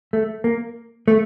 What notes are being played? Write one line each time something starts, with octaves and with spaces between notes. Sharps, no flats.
A3
A#3
A3